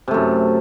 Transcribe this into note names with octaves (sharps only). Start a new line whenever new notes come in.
F#2 C3 A3